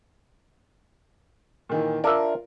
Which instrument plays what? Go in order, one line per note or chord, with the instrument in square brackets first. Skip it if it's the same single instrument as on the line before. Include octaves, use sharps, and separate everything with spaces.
[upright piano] A#2 D#3 E3
[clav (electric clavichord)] D4 E5 [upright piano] F4 A#4